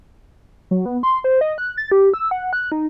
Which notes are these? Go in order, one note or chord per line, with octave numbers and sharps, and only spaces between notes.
F#3
B3
C6
C5
D#5
F#6
A6
G4
E6
F#5
F#6
D#4